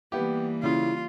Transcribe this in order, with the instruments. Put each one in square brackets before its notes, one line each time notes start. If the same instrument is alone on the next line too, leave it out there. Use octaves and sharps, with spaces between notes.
[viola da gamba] E3 G3 A#3 [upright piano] B3 G4
[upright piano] C#3 C#4 [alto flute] E4 [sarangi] F4